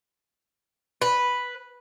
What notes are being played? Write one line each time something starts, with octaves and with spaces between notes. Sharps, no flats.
B4